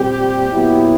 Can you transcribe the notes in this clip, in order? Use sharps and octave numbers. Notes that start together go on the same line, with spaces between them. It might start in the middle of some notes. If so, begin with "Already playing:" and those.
Already playing: A#2 G3 C4 G4
A#2 F#3 B3 E4